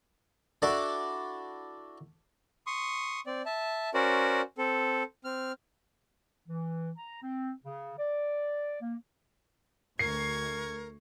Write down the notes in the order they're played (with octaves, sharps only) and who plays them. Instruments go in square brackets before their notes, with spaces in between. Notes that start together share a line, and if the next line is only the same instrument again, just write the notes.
[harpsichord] D4 E4 F#4 A4 D5 D6
[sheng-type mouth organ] C6 C#6 D#6
C4 D5
E5 A5
C#4 F#4 A#4 C5 D5
C4 A4
C4 F6
[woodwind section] E3
A#5
C4
C#3
D5
A#3
[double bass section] D2 [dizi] A#4 [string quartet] C#6 G#6 [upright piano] C7